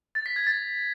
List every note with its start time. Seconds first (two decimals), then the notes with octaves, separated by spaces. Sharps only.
0.15 A6
0.26 B6
0.36 G#6
0.47 A6